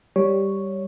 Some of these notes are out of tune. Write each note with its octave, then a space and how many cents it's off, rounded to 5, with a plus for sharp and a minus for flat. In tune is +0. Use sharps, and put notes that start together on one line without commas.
G3 +0 C#5 +0